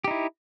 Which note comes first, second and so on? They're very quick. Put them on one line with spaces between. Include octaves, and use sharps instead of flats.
G4 D#4 E4